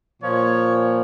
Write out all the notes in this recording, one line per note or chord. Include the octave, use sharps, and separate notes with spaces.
A#2 F3 A#3 C#5